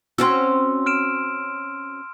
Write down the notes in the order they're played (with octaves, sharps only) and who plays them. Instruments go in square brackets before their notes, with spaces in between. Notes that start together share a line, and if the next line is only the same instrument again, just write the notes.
[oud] C4 C#4 F#4 [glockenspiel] C6 E6
[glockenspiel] F6 D7 E7